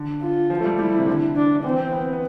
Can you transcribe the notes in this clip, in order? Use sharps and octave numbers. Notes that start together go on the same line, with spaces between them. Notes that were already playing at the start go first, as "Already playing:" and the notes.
Already playing: D3
F4
F3
A3
G3
G3 E4
C3
D3
D4
E3 C4
B3
B3